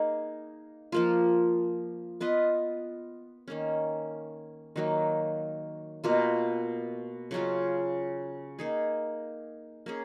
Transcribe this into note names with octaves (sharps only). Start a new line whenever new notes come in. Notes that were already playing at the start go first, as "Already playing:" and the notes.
Already playing: A#3 D#4 G#4
F3 A#3 F4
B3 F4 B4 D#5
D#3 A#3 C#4
D#3 F#3 A#3 D#4
B2 A#3 F4
C#3 F#3 C#4 F4
A#3 D#4 G#4
A#3 C#4 G#4